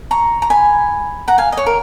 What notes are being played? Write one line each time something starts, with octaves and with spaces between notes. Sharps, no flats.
A#5 C#6
A#5
G#5 B5
F#5 A#5
F5 G#5
D#5
C#5
A#4